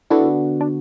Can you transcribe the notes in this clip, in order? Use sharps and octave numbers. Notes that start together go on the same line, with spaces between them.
D3 B3 D4 E4 F#4 A4
D4